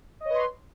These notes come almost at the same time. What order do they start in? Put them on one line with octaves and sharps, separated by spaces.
D#5 C#5 B4 C6